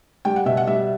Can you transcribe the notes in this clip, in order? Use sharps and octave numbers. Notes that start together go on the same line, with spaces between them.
G3 G5
F#5
B2 E5
F#5
G3 E5